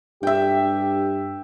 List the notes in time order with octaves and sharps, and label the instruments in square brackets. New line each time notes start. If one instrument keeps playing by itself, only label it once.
[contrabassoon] G2 [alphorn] G4 [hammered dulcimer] E5 G5